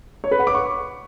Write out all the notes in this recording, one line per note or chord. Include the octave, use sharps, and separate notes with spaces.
C#5
B4
F#5
D6
C#6